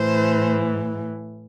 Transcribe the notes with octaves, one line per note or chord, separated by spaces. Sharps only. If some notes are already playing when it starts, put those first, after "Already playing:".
Already playing: A2 E3 C5